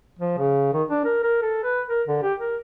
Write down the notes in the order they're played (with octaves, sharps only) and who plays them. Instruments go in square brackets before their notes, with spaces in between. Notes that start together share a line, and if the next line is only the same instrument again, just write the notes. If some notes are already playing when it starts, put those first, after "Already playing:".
[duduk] F3
C#3
D#3
D4
A#4
A#4
A4
B4
A#4
D3
G4
A#4